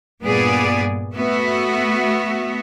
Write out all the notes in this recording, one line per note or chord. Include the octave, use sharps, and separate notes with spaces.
G2 A#2 B3 G#4 D5
A3 B3 F#4 E5